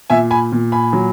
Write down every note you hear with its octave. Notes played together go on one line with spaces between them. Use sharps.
A#2 E5 G#5
G#5 B5
A#2
G#5 B5
F#3